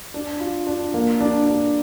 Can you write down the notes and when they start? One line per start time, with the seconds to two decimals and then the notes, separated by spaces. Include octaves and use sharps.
0.14 D4
0.40 F4
0.67 D4
0.94 A#3
1.20 D4
1.47 D4